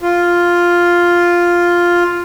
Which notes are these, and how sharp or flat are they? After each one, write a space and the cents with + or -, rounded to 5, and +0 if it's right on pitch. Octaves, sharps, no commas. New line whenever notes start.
F4 +0